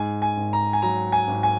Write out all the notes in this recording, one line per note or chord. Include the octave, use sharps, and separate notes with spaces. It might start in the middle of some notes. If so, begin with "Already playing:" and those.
Already playing: G#2 G#5
G#5
G#1
A#5
G#5
F#3 A#5
G#5
G#1
G#5